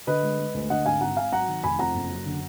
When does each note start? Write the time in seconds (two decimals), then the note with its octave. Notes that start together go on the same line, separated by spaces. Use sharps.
0.07 D3 B4 D#5
0.23 G#3
0.39 G#3
0.54 D2
0.70 D3 D#5 F#5
0.85 G#1 F5 G#5
1.01 G#1 F#5 A#5
1.17 G#1 F5 G#5
1.32 F#3 F#5 A#5
1.48 D#3
1.63 F1 G#5 B5
1.79 F2 F#5 A#5
1.95 F#1
2.10 F#2
2.26 D3